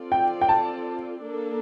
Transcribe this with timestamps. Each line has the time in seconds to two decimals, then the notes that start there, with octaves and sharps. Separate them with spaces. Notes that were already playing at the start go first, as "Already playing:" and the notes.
Already playing: C4 F4 A4 D5
0.12 G5
0.41 G5
0.49 A5
1.24 A#3 D4 A4